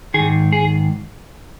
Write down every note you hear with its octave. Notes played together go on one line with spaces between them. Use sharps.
G#2 D#3 G#4
G#4